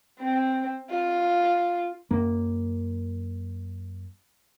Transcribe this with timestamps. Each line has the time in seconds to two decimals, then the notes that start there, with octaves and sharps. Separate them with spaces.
0.21 C4
0.90 F4
2.11 F#2 A#3